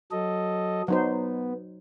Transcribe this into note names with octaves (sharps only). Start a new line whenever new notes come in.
F#3 A4 D#5
F#3 B3 D#4 C5